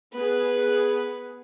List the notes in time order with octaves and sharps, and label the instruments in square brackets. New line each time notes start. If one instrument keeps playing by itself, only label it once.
[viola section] B3 G#4 [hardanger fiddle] B4